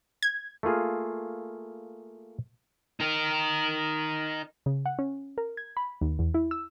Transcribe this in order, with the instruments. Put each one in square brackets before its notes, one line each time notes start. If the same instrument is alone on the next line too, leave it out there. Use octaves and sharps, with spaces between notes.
[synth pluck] G#6
[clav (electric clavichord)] A3 A#3 F4 G#4
[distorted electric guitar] D#4 A#4
[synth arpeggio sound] C#3
F#5
C#4
A#4
G#6
B5
D#2
E2
E4
E6